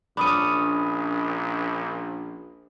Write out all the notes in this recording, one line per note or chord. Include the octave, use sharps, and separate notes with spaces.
A#1 C#4 D4 B5 D#6 D#7